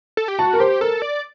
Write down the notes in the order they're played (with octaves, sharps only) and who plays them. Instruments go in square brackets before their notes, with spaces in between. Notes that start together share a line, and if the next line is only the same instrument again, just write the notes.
[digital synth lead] A4
G4
[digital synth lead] F#4 [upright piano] A5
[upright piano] A#4
[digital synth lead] G4 [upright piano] C5
[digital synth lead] A4 [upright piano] A#4
[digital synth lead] D5